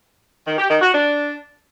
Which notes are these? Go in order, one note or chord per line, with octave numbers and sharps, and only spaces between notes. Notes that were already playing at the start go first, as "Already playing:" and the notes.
D#3
G4
D#3
F#4
D4